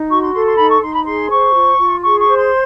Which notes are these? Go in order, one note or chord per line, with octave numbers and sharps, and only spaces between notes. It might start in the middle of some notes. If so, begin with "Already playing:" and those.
Already playing: D#4
F#4 C#6
C6
A4 C6
C6
D#4 B5
C#6
D#4 C6
B5
G#4 C6
C5 C#6
F4
F4
G#4 C#6
C#6
C5
C6